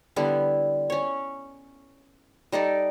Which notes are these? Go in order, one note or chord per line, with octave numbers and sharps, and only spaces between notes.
D3 G3 B3 E4
C#4 C#5
G3 D#4 A4 D5